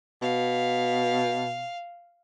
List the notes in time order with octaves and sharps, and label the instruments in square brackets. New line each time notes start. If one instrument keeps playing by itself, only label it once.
[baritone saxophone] B2 [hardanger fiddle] F5